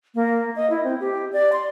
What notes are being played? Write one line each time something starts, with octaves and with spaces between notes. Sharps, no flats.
A#3
D#5
E4
C4
G4
D5
C6